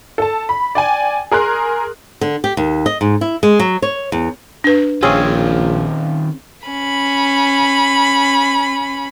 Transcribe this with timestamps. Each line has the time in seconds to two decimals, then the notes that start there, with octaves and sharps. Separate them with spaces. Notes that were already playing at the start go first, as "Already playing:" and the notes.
0.18 A4 A5
0.49 B5
0.75 D5 G5 G#5
1.32 G#4 A#4 C6 F#6
2.21 D3
2.44 G4
2.57 D#2
2.86 D#5
3.01 G#2
3.21 E4
3.43 G#3
3.60 F#3
3.82 C#5
4.12 E2
4.64 D4 B4
5.03 A#1 D#3 C4 C#4 F4 G#4
6.67 C#4 B5